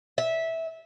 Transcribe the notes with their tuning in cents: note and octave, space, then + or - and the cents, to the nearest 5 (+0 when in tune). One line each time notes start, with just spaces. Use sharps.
E5 -15